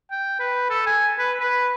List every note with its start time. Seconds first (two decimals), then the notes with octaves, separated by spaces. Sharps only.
0.11 G5
0.40 B4
0.70 A4
0.86 G#5
1.19 B4
1.39 B4